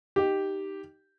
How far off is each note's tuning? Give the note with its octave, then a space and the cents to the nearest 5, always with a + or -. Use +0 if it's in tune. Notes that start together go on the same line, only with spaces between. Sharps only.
D#4 +0 G4 -5